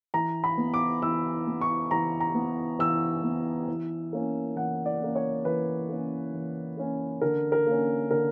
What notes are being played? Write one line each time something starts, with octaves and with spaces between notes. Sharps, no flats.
E3 A#5
B5
B3
D6
E3 E6
B3
C#6
E3 A#5
A#5
B3
E3 E6
B3
E3
A#3 C#4
E3 F#5
D5
A#3 C#4
C#5
E3 B4
A#3 C#4
E3
A#3 C#4
D3 A#4
A#4
A#3 C#4
D3 A#4